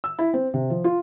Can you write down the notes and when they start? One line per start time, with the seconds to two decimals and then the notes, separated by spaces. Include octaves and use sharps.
0.04 E6
0.19 E4
0.34 C4
0.54 C3
0.70 F3
0.84 F4